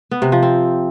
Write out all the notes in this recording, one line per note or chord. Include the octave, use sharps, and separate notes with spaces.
B3
C3
F3
C4